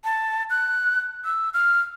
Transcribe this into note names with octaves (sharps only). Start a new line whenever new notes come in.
A5
F#6
E6
F6